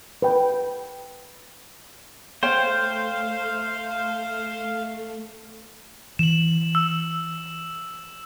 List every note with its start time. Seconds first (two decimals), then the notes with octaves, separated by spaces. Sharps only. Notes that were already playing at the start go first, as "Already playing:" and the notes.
0.22 B4 G5
2.43 A3 C5 C#5 F5 G5
6.19 E3 E7 F#7
6.75 E6